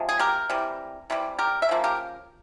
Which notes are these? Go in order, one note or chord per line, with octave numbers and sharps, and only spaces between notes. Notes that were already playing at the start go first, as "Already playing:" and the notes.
Already playing: C3 F3 G#3
G#4
G4 A#4
C3 E3 G3
C3 E3 G3
G4 A#4
E5
C#3 F3 A#3
G4 A#4